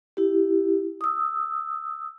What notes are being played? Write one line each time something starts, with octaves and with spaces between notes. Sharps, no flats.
E4 G4
D#6 E6